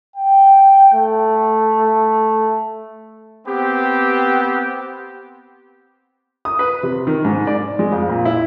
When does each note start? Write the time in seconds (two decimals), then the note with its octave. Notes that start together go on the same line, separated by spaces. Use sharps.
0.16 G5
0.93 A3
3.46 B3 C4 G4
6.45 D#6
6.59 B4
6.83 C3
7.07 D#3
7.25 G#2
7.47 D5
7.79 G#3
7.92 F2
8.09 A#2
8.25 E4